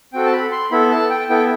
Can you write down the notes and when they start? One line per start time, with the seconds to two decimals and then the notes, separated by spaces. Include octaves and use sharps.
0.13 C4 F#4 A4 G5
0.26 A5
0.33 B5
0.52 C6
0.72 B3 E4 A4 B5
0.91 A5
1.10 G5
1.30 B3 E4 A4 G5